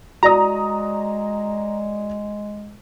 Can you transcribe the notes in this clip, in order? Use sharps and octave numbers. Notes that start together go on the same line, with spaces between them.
G#3 F#4 D5 A#5 D#6